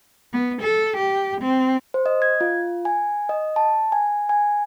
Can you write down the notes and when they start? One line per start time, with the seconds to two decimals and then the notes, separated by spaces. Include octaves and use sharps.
0.33 B3
0.62 A4
0.97 G4
1.41 C4
1.94 C5
2.06 D#5
2.22 G#6
2.41 F4
2.85 G#5
3.29 D#5
3.56 A5
3.92 G#5
4.29 G#5